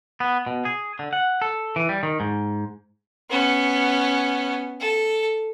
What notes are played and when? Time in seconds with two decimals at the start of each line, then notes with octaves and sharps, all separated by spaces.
0.20 B3
0.47 B2
0.65 G#4
0.99 D3
1.13 F#5
1.42 A4
1.76 E3
1.89 G3
2.03 D#3
2.20 G#2
3.30 B3 C#4
4.80 A4